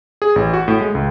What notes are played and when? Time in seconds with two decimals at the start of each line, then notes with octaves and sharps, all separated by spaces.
0.22 G#4
0.36 A1
0.53 F#4
0.68 A2
0.81 G#3
0.95 C#2